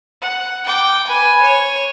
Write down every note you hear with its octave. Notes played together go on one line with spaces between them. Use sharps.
F#5
G5 D6
B4 G#5
C#5